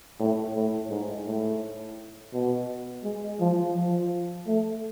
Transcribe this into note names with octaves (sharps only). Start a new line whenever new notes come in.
A2
A2
G#2
A2
B2
G#3
F3
F3
A3